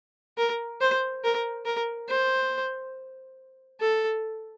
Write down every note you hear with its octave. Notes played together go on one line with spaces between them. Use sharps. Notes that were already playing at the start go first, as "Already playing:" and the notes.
A#4
C5
A#4
A#4
C5
A4